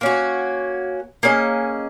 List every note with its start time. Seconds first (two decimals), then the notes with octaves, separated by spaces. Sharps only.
0.01 A#3 C#4 F#4
1.23 A#3 C#4 G#4 D#5